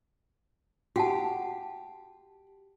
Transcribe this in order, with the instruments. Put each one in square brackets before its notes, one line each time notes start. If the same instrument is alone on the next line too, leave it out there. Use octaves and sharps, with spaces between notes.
[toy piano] F#4 F#5 A5 [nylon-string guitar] G4